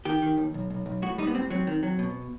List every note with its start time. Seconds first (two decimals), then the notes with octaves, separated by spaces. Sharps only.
0.05 D#3 G4
0.22 D#3
0.37 D#2
0.54 B1
0.70 B1
0.86 B1
1.02 A2 F#4
1.18 G3 D#4
1.27 B3
1.34 A2 C4
1.50 F#3 C4
1.67 D#3
1.83 F#3
1.99 B2